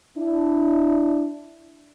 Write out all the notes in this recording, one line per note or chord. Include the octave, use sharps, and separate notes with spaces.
D4 E4